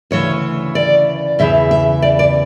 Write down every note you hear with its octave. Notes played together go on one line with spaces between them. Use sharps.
D2 C#3 E3 C#5
D5
E2 C#3 E3 E5
E5
D5
D5